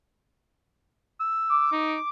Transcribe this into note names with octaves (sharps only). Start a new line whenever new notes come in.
E6
D6
D#4